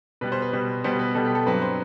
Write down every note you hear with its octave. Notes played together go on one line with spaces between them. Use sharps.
B2 G3 B3 B4
C5
B4
B2 G3 B3
B2 G3 B3 C5
B4
B2 G3 B3 A4
G4
A4
G2 F#3 C4 B4
C5